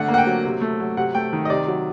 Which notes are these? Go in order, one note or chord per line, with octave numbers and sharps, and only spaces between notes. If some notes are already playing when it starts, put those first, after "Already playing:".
Already playing: D3 A3 F#5
A#3
F#5
G5
F#3
C3
A3
F#3
C3 F#5
A3 G5
D#3
D#5
C3 D5
F#3